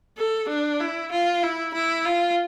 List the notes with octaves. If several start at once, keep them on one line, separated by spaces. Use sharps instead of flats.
A4
D4
E4
F4
E4
E4
F4